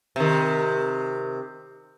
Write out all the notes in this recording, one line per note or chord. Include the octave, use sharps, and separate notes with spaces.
C3 D#3